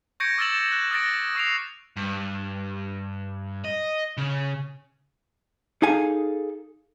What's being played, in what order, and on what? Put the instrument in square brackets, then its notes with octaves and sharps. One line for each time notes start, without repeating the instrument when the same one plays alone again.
[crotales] C#6 G6 G#6 A#6 C#7 D7
D6 E6 F6 A6 E7 F#7
F#6
D#6 F6 F#6 A6 A#6 D7
C#6 D#6 C7 D7 F7
[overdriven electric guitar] G2
D#5
C#3
[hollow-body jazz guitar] D#4 G#4 A4 F5 G#5